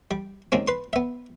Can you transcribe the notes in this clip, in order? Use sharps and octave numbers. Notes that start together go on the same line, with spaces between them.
G3
D#2 C#3 G#3 C4
B4 C6
B3 E5